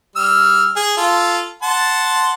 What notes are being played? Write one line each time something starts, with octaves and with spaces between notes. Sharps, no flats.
G3 E6 F6
G#4
F4 A4
F#5 A5 C6